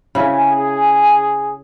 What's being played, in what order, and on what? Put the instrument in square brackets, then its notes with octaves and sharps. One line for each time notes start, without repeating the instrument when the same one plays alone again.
[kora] C#3 E4 [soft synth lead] G#5
[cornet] G#4